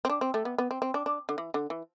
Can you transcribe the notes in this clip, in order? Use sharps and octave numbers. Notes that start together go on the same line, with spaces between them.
C4
D4
C4
A3
B3
B3
C4
C4
D4
D4
D3
E3
D3
E3